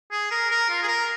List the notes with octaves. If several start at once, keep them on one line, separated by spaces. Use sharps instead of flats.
G#4
A#4
A#4
F4
G#4
A#4